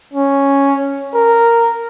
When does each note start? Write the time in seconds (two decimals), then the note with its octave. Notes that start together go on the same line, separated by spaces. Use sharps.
0.13 C#4
1.14 A#4